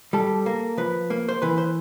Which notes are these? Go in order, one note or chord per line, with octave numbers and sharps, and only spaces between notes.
G3 A4
A#3
F3 B4
A#3
C5
E3 B4
C5